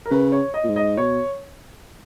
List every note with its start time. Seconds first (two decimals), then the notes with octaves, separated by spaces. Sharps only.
0.06 A#4
0.11 C#3 B4
0.32 C#5
0.54 D#5
0.64 A#2
0.69 G#2
0.76 D#5
0.97 B2 C#5